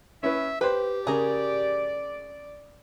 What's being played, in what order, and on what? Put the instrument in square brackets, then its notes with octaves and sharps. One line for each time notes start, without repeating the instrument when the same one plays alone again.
[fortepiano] C#4 E4 B4 [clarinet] E5
[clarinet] G4 [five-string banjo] B4 [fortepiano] C5 G5
[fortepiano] C#3 [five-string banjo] G#4 A#4 [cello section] D5